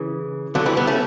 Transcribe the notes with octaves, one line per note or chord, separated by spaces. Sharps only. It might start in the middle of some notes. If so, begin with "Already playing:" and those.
Already playing: C#3 E3
D3 F#3
E3 G3
G3 B3
A3 C#4